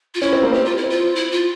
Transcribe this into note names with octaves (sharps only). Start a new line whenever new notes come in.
F4
C#4 E4
C4
A#3
C4 G4
F4
E4
C4
F4
E4
F4